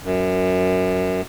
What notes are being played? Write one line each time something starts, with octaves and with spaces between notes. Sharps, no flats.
F#2